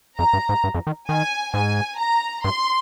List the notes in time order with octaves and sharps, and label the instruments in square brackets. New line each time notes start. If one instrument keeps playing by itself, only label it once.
[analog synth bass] F2 [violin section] A#5
[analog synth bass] G2
G#2
G2
F2
D#3
[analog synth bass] D#3 [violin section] G#5
[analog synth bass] G#2 [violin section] G#5
[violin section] A#5
[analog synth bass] G2 [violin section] C6